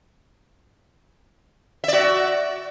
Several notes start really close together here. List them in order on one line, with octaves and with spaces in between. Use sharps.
E5 D5 F#4